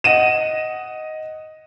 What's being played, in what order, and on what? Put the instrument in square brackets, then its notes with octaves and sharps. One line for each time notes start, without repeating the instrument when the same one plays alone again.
[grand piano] D#5 F#5 D#7 E7